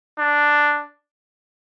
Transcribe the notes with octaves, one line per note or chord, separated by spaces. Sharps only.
D4